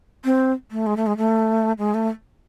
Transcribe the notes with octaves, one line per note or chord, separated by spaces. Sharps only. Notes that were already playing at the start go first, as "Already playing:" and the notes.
C4
A3
G#3
A3
G#3
A3
G#3
A3